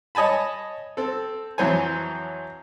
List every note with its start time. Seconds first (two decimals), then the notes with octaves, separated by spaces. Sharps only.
0.15 C#5 D#5 G#5 A5 B5
0.97 C4 A4
1.58 F2 E3 F#3 C5 C#5 G#5